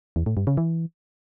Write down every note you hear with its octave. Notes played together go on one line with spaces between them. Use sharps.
E2
A2
G2
C#3
E3